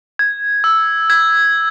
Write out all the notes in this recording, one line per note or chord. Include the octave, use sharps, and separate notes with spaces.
G#6
E6
G#6